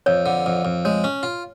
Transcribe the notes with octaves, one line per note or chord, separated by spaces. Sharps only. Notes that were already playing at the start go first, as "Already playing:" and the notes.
F2 C#5
D3
F2
F2
G#3 C#5
C#4
F4